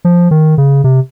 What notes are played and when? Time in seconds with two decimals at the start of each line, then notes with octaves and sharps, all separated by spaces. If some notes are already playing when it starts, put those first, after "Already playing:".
0.05 F3
0.31 D#3
0.58 C#3
0.84 C3